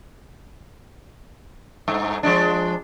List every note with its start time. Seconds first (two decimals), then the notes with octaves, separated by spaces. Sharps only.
1.88 G2
2.23 F3 G#3 D4